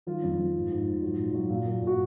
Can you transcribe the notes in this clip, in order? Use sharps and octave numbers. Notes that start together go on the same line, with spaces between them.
D#3 F3 F4
F2
F2
G#2
G#2
G#2
F#3
A#2
F#3
A#2
A#2
A#2
F#4